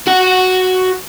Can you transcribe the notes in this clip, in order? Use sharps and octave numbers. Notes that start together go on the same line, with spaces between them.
F#4 F#5